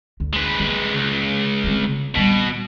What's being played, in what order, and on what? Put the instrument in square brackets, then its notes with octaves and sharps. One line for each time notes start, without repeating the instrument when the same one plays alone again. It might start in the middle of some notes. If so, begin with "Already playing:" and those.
[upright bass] D2
[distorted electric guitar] G#3 B4
[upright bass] A#3
[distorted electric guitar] C#2
[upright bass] B3 C4
[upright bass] D#1 G3 [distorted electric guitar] B2